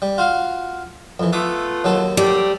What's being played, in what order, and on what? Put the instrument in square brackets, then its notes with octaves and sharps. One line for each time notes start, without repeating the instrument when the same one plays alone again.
[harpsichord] G3
F4 F#4 F5
F2 E3
[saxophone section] A3 B3 F4 [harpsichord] E5 D6 D#6
[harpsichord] D#2 F#3 A4
[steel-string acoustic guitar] G3 [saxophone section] A3 C4 D5